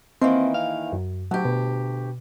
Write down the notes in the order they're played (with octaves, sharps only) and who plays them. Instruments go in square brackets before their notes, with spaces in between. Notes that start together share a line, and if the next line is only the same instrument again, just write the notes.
[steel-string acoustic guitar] D#3 E3 A#3 [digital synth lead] C4
[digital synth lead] F5
F#2
[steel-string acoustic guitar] D2 G4 [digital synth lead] F#3
[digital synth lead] B2